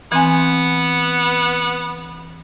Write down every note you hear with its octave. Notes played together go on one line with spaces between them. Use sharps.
E3 B3 C4 G#5